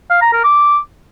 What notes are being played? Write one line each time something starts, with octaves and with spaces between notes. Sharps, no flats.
F5
A#5
A#4
D6